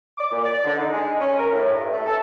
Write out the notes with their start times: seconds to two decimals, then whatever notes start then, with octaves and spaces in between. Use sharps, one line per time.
0.18 D6
0.31 A#2
0.43 D5
0.64 D3
0.77 D#4
0.92 G#3
1.20 C#4
1.37 A#4
1.52 A2
1.72 G2
1.91 A3
2.06 A4